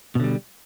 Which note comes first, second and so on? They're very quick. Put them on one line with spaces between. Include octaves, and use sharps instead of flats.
B2 D3 G3